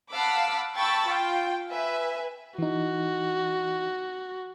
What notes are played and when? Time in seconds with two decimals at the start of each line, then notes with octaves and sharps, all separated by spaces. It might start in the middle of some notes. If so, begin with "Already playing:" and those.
0.13 F5 F#5 A5 B5 D6 E6
0.78 G5 A5 B5 C#6 E6 A6
1.09 F4 G5
1.71 B4 E5 G#5
2.58 E3 D#4 F#4